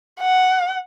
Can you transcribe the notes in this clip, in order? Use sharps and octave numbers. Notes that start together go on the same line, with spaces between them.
F#5